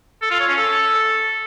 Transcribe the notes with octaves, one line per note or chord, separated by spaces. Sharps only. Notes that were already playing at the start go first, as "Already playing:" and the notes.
A4
F4
C#5
C#4
A4